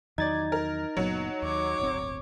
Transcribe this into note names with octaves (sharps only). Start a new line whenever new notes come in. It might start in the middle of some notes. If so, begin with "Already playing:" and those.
E2 D#3 F#3 D#4 D5 G#6 A6
A#4
F#1 A#2 F#3 B3
D#2 C#5 D6
D1 G1 C4